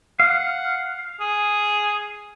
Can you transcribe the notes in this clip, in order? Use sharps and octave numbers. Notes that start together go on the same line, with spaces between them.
F5 F#5
G#4